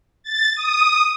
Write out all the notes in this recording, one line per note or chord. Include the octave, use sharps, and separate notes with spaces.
A6
D#6